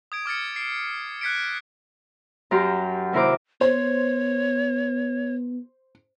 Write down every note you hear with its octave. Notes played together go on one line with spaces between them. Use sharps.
D#6 G#6 D7
D6 F6 A6 C#7
C7 D7
F#6 G#6 B6 C#7 D7
F#2 F#4 G4 A#5 C6
D#2 C3 E4 A#4 C5 D6
B3 C5 C#5